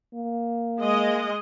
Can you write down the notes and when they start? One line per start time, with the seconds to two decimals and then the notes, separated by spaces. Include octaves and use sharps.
0.15 A#3
0.80 G#3 D#5